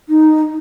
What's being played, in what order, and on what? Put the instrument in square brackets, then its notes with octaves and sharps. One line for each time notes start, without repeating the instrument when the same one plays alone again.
[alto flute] D#4